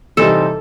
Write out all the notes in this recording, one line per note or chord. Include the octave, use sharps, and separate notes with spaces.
C3 E3 G3 C4 D#4 A4